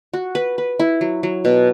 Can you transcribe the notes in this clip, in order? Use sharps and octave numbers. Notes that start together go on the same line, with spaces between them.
F#4
B4
B4
E4
F#3
F#3
B2